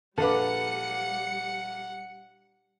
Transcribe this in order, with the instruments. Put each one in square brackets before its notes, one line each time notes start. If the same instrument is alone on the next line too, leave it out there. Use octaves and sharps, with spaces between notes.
[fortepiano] A#1 F5 D6 [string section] G3 C#7 [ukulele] A4 B4 [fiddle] F#5